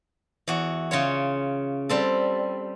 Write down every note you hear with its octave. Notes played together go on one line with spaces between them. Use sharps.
E2 F#4
C#3 F4 C#5
G3 C4 A4